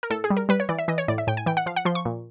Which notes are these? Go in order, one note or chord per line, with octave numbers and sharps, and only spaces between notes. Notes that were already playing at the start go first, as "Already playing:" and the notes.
A#4
A2 A4
G#4
G3
A#4
G3 B4
C#5
E3 D5
E5
E3 D#5
C#5
A2 D5
E5
A2 G5
G#5
E3 G5
F#5
F3 F5
F#5
F3 C6
C#6
A#2